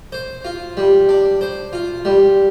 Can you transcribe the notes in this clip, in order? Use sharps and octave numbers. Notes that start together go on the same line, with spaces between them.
C5
F4
G3
D4
C5
F4
G3